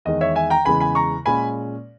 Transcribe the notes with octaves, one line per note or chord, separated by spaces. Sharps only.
E2 D#3 G#3 D#5
C#5 E5
E5 G#5
G5 A#5
E2 C#3 E3 G#3 G#5 B5
G#5 B5
A#5 C#6
A#2 G#3 C#4 G#5 B5